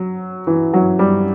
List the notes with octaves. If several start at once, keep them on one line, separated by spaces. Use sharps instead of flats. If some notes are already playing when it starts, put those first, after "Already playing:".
Already playing: F#3
E3
F#3
G3